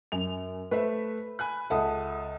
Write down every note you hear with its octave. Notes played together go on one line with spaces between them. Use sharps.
F#2 F7
A3 B4 C5 E5
G#5 B5 F#6
C#2 A4 E5 F#5 A5 D#6